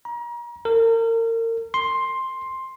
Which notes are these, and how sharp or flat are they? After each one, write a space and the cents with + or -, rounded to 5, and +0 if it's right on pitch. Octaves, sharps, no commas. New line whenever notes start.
A#5 +35
A#4 -35
C6 +10